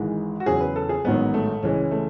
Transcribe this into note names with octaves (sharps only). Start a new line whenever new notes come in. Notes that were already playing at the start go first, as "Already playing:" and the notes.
Already playing: G#1 G#2 E3 G#3
F#4
E2 C#3 F#3 G#4
B4
A4
G#4
A1 G#2 D#3 F#3 B3
A3
C#2 C#3 E3 G#3 C#4
A3